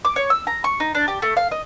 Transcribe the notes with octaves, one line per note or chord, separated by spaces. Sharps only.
D6
C#5
E6
A#5
C#6
D#4
D4
G4
A3
F5
D#5